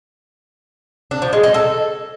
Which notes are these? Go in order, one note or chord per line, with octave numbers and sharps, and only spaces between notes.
D4
F3
G#3
D#4
A4